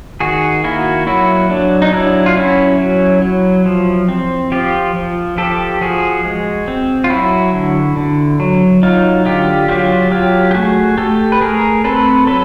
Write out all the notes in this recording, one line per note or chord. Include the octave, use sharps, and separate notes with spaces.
D#3 F#4 G#4
A#3 E4 F#4
F#3 E4 F#4
F#3 D4
D#4
F#3 D4 E4
F4
C#4 E4 F#4
F#3
F#3
F3
C4
F3 F4 G4
F3
F3 G4 A4
F3 F#4 G#4
G#3
C4
F4
F#3 E4 F#4
D3
D3
F#3
F#3 D#4 F4
D3 F4 G4
F#3 F4 G4
F#3 F4 G4
G4
A3 F#4 G#4
A3 G4 A4
B4
A3 G#4 A#4
C4 A4 B4
F#3 A4 B4